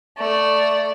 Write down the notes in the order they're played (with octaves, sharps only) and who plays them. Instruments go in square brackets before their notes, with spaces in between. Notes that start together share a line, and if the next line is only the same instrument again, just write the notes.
[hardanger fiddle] A3 D5